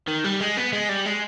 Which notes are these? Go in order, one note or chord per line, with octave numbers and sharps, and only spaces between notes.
D#3
G3
G#3
B3
G#3
G3
G#3